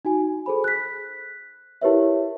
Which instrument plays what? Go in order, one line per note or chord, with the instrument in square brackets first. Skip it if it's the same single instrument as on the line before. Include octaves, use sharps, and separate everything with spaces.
[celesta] D#4 F#4 G#5
G#4 A4 C5 B5
F#6 B6
E4 G4 A#4 B4 C#5 E5